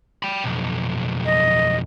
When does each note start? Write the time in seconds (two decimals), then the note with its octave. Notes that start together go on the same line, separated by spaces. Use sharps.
0.23 G5 B5
0.44 B1 F2
1.25 D#5